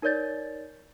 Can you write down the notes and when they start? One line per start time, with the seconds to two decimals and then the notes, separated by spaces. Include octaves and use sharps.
0.02 D#4 A#4 C#5 D5 G6 A6